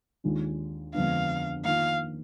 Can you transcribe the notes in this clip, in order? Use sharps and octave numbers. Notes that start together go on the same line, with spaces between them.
D#2 D#3 G#3 D4 F4
F2 D3 G#3 B3 D4 F5
D#3 A#3 F4 F5